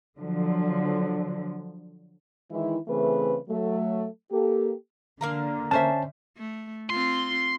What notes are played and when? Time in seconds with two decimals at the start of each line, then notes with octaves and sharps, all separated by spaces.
0.19 D3 F3 F#3
2.51 D#3 E3 G#3 E4
2.88 C#3 E3 A3 C4 G#4 B4
3.49 F#3 A3
4.31 A#3 G4 A4
5.21 D3 A#3 F5 A#5
5.71 C#4 C5 E5 A5
6.38 A3
6.90 C4 F4 C6